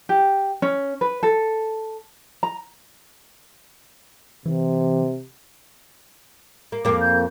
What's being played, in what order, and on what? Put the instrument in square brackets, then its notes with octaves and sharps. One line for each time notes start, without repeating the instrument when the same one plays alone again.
[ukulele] G4
C#4
B4
A4
A#5
[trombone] C3 [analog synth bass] E3
[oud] A#3
[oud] F2 A#3 [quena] D6
[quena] G6